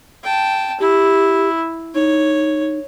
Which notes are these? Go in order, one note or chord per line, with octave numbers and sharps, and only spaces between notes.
G5 A5
E4 G4
D#4 C#5